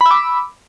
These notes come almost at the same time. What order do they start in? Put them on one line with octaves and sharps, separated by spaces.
B5 E6 D6